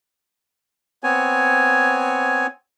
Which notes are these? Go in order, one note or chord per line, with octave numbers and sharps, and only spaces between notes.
B3 C4 C#5 G#5